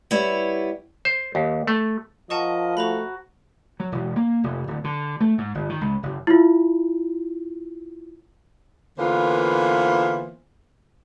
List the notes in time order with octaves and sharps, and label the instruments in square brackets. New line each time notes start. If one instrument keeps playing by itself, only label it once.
[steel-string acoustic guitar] G3 B3 E4 C#5
[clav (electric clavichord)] C5
D#2
A3
[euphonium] F3 [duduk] A#4 [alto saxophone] D#5 [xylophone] F#5 A5 C#6
[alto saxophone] A3 [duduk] F#4 [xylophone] C5 A#5 B5
[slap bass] F#3
E1
A#3
F1
D1
D3
A3
G#2
G1
D#3
C#2
F#1
[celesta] E4 F4
[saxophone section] D3 E3 A#3 B3 F4 C5